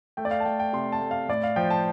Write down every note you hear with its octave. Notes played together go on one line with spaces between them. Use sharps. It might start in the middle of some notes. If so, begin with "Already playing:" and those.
A3 G5
D5
F5
A5
A3 G5
G5
C3 C6
A5
A3
F5
A2 D5
F5
F3 G5
A5